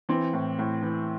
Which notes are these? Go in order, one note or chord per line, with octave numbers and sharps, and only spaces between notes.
E3 C4
A2
A2
E3